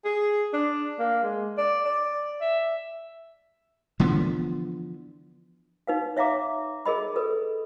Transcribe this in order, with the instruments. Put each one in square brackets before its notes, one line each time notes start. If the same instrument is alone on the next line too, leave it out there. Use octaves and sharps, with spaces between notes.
[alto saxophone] G#4
D4
A#3
G#3
D5
D5
E5
[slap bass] D3 E3 F3 B3
[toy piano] D#4 B4 F5
C#5 E5 F5 A#5 D6
G#4 A#4 D#5 B5
A4 B4